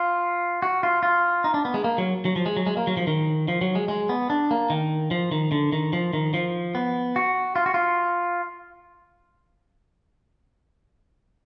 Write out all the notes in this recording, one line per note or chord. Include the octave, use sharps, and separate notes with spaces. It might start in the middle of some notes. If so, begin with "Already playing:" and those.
Already playing: F4
F#4
F4
F4
D#4
D4
B3
G#3
A#3
F#3
F#3
F3
G#3
F#3
G#3
A#3
F#3
F3
D#3
F3
F#3
G#3
G#3
B3
D4
A#3
D#3
F3
D#3
D3
D#3
F3
D#3
F3
B3
F#4
F4
F#4
F4